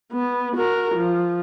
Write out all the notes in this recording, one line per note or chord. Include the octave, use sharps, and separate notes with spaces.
B3
F#4 A#4
F3